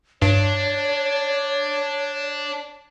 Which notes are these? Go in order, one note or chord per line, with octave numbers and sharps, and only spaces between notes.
G2 D4 C#5